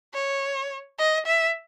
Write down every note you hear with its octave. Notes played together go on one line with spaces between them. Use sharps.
C#5
D#5
E5